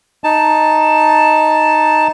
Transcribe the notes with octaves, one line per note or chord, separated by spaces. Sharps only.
D#4 A5